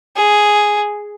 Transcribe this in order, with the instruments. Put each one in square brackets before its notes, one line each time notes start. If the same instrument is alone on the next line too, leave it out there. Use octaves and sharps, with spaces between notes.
[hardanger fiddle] G#4